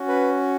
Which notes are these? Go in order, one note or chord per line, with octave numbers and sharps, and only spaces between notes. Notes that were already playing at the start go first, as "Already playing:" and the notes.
Already playing: C#4 F#4
B4